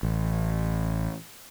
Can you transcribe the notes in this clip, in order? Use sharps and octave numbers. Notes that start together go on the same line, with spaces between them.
A1